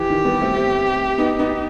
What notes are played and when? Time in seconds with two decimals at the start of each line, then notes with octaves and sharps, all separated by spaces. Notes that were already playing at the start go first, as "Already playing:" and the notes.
Already playing: E3 G4
0.10 D#3
0.25 G3 B3
0.40 A3 C4
0.56 A3 C4
1.18 B3 D#4
1.39 B3 D#4